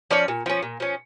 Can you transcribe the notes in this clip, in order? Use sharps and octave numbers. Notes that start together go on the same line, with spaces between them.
F3 C#4 D5
A#2
F3 C#4
A#2
F3 C#4